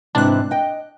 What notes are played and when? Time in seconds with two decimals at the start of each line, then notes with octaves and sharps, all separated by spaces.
0.15 G#2 C3 E3 D4 F#6
0.51 D#5 G5